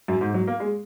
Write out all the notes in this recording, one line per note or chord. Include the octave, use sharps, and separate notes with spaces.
F#2
G#2
F#3
A#3
G#3